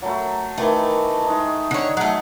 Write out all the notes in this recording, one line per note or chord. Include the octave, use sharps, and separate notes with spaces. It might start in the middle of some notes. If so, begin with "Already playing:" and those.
F#3 A3 B5
D#3 E3 A3
G#3 D#4
D3 C#5
F#3 A3